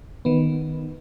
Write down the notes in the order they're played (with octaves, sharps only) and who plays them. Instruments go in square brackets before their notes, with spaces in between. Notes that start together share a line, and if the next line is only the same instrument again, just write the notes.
[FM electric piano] D#3 B3